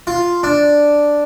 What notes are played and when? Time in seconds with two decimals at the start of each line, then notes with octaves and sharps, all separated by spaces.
0.07 F4
0.43 D4